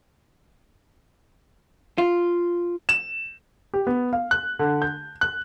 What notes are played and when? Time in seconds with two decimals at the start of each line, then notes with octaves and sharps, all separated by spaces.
1.98 F4
2.89 E7
3.74 G4
3.87 B3
4.13 F5
4.31 F#6
4.59 D3
4.82 G6
5.21 F#6